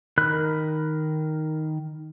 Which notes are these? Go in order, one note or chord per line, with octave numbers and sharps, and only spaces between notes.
D#3 A#4 B5 F#6